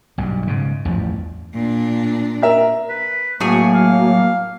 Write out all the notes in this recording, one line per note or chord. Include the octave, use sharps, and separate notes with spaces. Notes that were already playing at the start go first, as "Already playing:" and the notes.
B1 G2
G#2 C#3
A1 E2 G2 F3
A#2 D4
A#4 E5
B4
A2 F#3 A#3 G#4 G#5 C#6
F5